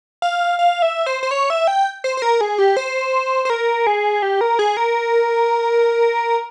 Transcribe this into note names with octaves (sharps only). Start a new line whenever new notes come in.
F5
F5
E5
C5
C5
C#5
E5
G5
C5
C5
A#4
G#4
G4
C5
C5
A#4
G#4
G4
A#4
G#4
A#4